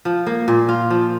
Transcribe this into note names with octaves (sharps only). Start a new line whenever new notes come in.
F3
A#3
A#2
F4
F3